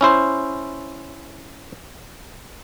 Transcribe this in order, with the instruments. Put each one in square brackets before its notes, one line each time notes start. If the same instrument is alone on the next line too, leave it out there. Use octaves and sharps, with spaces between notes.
[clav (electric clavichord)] C#4 E4 C5